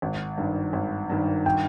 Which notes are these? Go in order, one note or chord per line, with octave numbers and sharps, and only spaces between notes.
G#1
G2 D#3
G#1
G2 D#3
G5